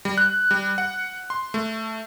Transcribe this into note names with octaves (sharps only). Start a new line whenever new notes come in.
G3
F#6
G3
F#5
C6
A3